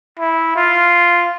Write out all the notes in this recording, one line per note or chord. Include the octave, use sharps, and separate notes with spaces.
E4
F4